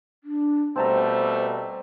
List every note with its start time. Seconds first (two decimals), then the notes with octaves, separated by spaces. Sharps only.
0.24 D4
0.76 B2 G3 A3 C4 C5 A5 A#5